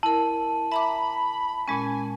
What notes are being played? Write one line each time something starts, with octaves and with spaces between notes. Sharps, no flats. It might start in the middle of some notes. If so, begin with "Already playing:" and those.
E4 A#4 A5
E5 A#5 B5 D6
A#2 G#3 C#4 G#5